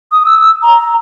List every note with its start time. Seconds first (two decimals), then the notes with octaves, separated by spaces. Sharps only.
0.12 D#6
0.26 E6
0.63 A#5